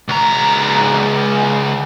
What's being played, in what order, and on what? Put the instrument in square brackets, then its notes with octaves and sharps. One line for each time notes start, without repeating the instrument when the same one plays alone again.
[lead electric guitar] C#2 A#5